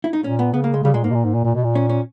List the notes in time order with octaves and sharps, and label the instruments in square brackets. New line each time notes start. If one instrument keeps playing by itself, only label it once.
[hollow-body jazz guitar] E4
D#4
[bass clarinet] A#2 [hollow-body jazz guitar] C#4
[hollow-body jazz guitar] B3
[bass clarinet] C#3 [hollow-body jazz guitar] B3
[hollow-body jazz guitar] A#3
G#3
[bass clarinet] C#3 [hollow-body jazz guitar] G3
[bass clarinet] A#2 [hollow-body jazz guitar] G#3
[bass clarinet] G#2 [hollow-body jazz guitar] A#3
[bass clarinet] B2
A#2
G#2
A#2
A#2
B2
A#2
[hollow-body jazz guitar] C#4
C#4